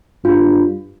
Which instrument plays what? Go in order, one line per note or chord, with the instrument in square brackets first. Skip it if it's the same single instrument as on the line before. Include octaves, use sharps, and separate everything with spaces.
[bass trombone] G2 [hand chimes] F4